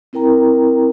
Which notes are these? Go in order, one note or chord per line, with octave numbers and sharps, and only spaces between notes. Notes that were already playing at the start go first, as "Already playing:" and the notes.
C4 E4 A#4 G5 A#5